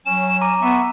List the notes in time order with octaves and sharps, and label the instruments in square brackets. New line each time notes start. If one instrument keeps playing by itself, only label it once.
[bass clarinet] F#3 [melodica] C#4 [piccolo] E7
[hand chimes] A#5 D6 [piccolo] D#7
[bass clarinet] B3 [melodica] E5 C#6